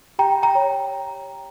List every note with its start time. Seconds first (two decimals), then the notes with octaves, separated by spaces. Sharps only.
0.19 G4 G5 A#5
0.43 G5 A#5
0.55 C#5